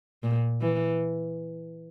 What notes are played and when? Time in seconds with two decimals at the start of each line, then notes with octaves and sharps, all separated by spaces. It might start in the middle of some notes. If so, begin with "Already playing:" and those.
0.23 A#2
0.61 E3